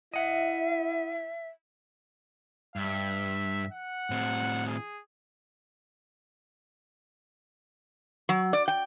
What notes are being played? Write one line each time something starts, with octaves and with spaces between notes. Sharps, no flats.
E4 D#5 E5 F#5
G2 E5
F#5
A2 C4
G#4
F#3
D5
G5